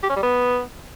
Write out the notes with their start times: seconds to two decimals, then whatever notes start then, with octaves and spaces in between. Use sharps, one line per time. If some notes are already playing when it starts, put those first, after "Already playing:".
0.03 G4
0.10 C#4
0.16 G3
0.23 B3